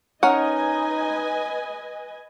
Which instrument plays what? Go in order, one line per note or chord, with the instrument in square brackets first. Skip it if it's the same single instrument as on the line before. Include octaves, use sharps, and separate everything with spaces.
[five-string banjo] C#4 A#4 F#5 [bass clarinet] D#4 [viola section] B4 D#5 G#5